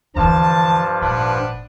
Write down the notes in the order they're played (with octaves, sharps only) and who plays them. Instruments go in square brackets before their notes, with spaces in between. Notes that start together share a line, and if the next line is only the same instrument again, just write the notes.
[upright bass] D2 E3 [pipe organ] G2 F3 [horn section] A5
[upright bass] G#1 A#2 [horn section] D4 B4 F#5